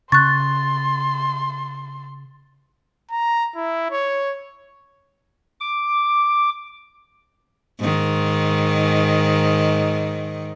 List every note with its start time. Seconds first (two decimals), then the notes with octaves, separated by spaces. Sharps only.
0.12 C#3 C6 C#6 F#6 A6
3.11 A#5
3.55 E4
3.91 C#5
5.60 D6
7.80 G#2 D#3